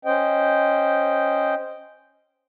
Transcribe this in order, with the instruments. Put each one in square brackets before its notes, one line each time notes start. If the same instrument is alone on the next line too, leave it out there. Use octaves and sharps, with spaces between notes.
[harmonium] C#4 C5 D#5 G5